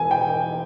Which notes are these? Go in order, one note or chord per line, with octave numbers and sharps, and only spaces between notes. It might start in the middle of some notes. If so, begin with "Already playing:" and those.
Already playing: E1 G#5
G5